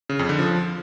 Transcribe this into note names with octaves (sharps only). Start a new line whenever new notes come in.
C#3
F2
D3
F3